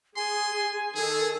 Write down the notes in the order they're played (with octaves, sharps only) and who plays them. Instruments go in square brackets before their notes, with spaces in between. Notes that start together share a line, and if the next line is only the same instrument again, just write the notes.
[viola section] G#4 [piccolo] G#5 [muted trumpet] C6
[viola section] D#3 A4 [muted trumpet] G#4